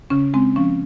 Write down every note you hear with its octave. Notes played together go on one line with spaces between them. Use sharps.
C#3 C#4
G#3 C4
F3 C#4